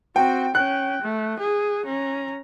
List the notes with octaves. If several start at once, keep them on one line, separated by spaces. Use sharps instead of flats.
C4 F#4 G5
C#4 G5 F#6
A3
G#4
C#4 A#5